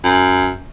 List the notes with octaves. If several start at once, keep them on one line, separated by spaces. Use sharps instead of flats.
F#2